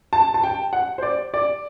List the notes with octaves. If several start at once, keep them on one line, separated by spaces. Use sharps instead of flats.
A5
A5
G5
F#5
C5
D5
D5